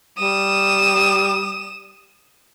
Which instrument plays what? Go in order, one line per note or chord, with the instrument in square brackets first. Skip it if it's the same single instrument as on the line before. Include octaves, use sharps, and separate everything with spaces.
[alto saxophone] G3 [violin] D#6 E7